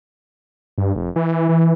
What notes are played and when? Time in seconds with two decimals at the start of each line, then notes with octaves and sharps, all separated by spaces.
0.78 G2
0.96 F1
1.16 E3
1.49 E3